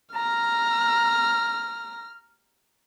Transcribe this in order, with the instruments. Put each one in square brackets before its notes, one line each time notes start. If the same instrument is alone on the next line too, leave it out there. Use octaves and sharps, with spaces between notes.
[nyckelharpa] A#5 [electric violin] F6